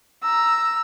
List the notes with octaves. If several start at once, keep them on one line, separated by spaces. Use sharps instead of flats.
A#5 E6